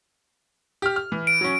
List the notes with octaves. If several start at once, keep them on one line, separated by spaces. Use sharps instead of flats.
G4 F6
F6
E3
D7
F#3 C#4